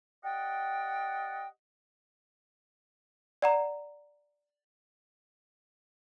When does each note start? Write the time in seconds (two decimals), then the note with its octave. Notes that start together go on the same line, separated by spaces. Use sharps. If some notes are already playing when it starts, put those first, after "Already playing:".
0.24 G4 D5 D#5 F#5 G5
3.42 D5 F#5 A#5